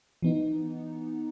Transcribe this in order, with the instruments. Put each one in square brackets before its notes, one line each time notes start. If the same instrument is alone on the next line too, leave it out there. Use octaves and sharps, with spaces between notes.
[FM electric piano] E3 B3 D#4